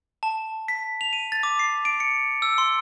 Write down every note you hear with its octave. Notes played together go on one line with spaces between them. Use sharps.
A5
B6
F7
D#7
A6
D6
C7
D7
C#7
E6
C6